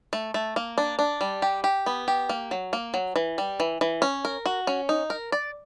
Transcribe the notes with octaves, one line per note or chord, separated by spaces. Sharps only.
A3
A3
A#3
D4
D4
G3
G4
G4
B3
G4
A#3
F#3
A#3
F#3
E3
G3
E3
E3
C#4
A#4
F#4
C#4
D#4
A#4
D5